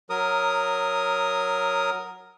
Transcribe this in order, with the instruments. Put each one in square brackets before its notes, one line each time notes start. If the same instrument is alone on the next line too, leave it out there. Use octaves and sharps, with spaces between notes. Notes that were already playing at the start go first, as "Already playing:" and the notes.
[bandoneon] F#3 A#4 D#6